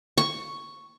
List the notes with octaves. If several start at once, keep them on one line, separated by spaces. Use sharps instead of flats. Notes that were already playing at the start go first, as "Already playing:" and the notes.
C#6